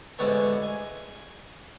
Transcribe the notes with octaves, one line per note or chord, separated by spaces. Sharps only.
A1 G#2 D3 B3 C#5 A5
G#5